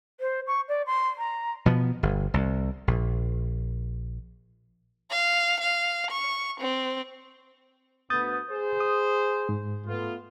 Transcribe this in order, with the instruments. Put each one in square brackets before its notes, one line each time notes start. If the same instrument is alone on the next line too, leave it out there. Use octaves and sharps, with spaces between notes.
[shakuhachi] C5
C#6
D5
C6
A#5
[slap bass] B2 F3 B3
G1
C2
A#1
[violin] F5
F5
C#6
C4
[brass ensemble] D2 B3 [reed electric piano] D#6 G6 A6
[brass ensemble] G#4 C5
[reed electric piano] D#6
G#2
[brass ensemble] A3 B3 F4